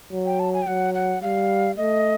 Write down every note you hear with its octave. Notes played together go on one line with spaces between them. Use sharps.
F#3
G5
A5
G#5
G5
F#3 F#5
F#5
G3 F5
A3 D#5